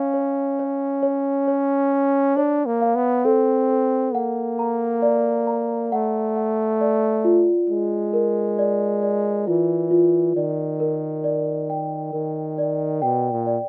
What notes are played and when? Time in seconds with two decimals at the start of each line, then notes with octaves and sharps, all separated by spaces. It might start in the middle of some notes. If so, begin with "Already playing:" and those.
Already playing: C#4 F5
0.14 C#5
0.59 C#5
1.03 C#5
1.48 C#5
1.92 C#5
2.36 D4 C#5
2.66 A#3
2.81 F5
2.95 B3
3.25 C4 A4
3.70 A4
4.14 A#3 F#5
4.59 A#5
5.02 D5
5.47 A#5
5.92 A3 F#5
6.37 F#5
6.81 D5
7.25 F4
7.69 G#3 F4
8.13 A#4
8.59 D5
9.03 D5
9.47 E3 F4
9.91 F4
10.35 D#3 D5
10.80 A#4
11.24 D5
11.70 G5
12.13 D#3 A#4
12.58 D5
13.02 B2 G5
13.31 A#2
13.47 D5